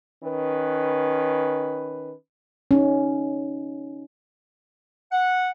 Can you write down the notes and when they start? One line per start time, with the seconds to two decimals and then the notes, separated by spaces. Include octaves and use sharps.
0.23 D#3 C#4 B4
2.71 C#4 D#4
5.12 F#5